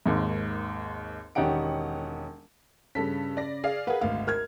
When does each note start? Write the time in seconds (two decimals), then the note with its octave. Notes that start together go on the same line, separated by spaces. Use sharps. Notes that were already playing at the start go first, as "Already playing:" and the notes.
0.06 G#1 D#2 G#2
1.35 E1 D#3 C#4 G4 F#5 D7
2.95 G2 C#3 A4 B6
3.37 D5 A#6
3.64 G#4 D5 F5
3.87 G#4 A#4 B4 F5 F#5
4.01 G#1 D2 F5
4.27 A#4 F6 G#6